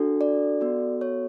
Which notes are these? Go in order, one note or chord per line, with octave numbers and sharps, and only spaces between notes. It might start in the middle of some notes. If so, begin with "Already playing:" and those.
Already playing: D4 F#4 A4
D5
B3 F#4 A4
C#5